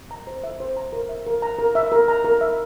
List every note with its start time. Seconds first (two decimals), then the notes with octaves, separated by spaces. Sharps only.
0.11 A#5
0.27 C5
0.44 E5
0.60 C5
0.77 A#5
0.93 A#4
1.09 E5
1.26 A#4
1.42 A#5
1.59 A#4
1.75 E5
1.92 A#4
2.08 A#5
2.25 A#4
2.41 E5